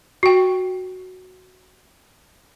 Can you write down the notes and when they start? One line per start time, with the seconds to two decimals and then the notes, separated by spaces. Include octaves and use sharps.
0.23 F#4 G5